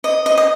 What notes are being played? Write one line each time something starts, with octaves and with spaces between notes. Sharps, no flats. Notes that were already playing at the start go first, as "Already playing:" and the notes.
D#5
D#5
D#5